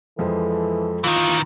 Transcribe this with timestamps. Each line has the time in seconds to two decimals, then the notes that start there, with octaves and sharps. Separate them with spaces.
0.19 F2 E3 F3 G#3 A4
1.04 D#3 E3 F4